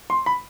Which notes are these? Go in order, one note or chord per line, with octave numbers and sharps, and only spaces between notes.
C6
B5